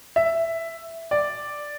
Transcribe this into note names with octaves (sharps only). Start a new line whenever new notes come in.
E5
D5